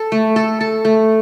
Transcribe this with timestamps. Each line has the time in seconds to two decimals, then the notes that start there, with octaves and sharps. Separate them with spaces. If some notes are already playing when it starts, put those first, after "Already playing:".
Already playing: A4
0.12 A3
0.36 A4
0.61 A4
0.85 A3